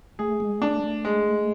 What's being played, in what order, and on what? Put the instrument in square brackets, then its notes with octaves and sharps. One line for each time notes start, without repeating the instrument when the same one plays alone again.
[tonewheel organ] A3 [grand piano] G#4
[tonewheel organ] G#3
[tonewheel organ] A3 [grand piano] D4
[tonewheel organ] A3
[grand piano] G#3